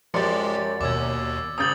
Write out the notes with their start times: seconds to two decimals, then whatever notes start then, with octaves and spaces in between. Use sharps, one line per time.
0.14 F#2 F3 G#3 G4 D5 C6 A6 C#7
0.81 D#2 B2 D6 E6 G#6
1.58 G#1 C#3 D#6 G6 A6 F#7